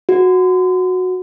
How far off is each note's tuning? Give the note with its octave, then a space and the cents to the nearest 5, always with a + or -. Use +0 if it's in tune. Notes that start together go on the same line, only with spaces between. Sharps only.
F#4 -10